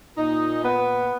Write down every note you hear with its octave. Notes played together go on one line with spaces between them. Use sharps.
A#2 D#4
B3